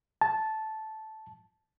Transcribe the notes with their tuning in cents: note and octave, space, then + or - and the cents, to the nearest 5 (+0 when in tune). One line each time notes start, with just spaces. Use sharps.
A5 -10